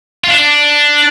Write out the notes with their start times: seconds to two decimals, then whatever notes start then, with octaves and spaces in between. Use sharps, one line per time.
0.24 F4
0.30 D4